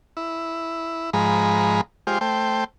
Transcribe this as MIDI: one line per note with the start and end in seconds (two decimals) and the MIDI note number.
0.17 1.10 64
1.13 1.81 44
1.13 1.81 53
1.13 1.81 56
1.13 1.81 82
1.13 1.81 83
2.07 2.18 56
2.07 2.18 65
2.07 2.18 67
2.07 2.18 72
2.21 2.64 57
2.21 2.64 72
2.21 2.64 79